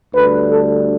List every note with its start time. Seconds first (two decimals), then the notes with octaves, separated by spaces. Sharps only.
0.14 D2 D3 G3 B4
0.48 A4